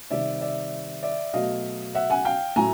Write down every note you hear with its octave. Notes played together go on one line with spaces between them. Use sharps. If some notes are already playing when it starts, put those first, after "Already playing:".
C3 D#3 G3 D5 E5
D5 E5
D5 E5
B2 F#3 A3 D#5 F5
E5 F#5
F#5 G#5
F5 G5
A2 F#3 A3 G#5 A#5